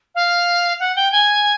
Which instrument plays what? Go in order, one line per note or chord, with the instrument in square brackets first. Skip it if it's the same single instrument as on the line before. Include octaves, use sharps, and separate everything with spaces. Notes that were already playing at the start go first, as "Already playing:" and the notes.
[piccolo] F5
F#5
G5
G#5